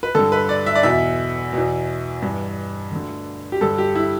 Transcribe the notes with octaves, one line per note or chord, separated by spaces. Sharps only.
B4
G2 D3 A4
B4
D5
E5
D5
E2 B2 E5
E2 B2
G2 E3
D2 D3
G4
G2 D3 A4
G4
E4